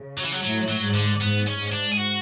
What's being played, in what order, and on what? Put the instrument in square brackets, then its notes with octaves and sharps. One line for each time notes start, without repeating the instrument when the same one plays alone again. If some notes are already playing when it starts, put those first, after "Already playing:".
Already playing: [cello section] C#3
[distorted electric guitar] F#3
E3
F#3
[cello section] A2 [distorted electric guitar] F#3
[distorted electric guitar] F#3
[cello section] G#2
[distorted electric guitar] D3
[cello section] G#2 [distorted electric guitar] B3
[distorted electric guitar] C#4
[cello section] G#2
[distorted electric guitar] D4
G#4
F#4